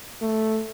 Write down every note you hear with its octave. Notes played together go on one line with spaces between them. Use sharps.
A3